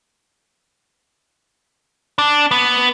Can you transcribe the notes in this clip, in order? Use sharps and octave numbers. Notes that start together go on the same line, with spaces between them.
D4
B3